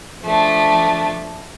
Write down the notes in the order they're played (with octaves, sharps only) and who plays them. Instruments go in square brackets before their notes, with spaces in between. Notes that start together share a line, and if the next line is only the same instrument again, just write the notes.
[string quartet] F3 A3 D4